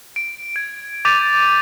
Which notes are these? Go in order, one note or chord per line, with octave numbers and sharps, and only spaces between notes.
D7
G#6 D7
D6 G6 A6 B6 D#7 F7